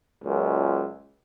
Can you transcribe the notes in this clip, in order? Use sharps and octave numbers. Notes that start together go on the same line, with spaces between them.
C#2 F#2 A#2